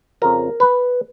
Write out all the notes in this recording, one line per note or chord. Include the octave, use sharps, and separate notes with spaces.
F2 C#3 F3 A#4
B4